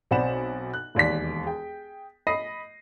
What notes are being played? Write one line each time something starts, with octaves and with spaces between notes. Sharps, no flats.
B1 C4 D5 F#5 B5 E7
F#6
E1 D#2 D5 B6
G#4 G5
D#5 B5 D#6 A#6 C7 D#7